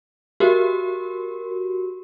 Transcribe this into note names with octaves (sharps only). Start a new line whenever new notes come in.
F#4 G4 A#4